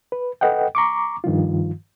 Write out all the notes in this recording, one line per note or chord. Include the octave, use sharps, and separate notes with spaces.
B4
A4 B4 D#5 F#5 G5
A#5 C#6 D6
G2 D#3 F3 F4